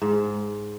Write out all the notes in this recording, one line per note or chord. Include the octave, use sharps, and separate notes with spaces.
G#2